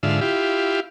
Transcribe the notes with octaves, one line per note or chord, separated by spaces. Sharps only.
G#2 D3 F4 E5
E4 F4 G4